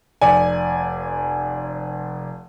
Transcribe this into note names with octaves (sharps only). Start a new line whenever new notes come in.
F1 D5 G#5